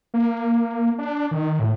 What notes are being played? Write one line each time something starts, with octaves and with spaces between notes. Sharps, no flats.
A#3
D4
D#3
A2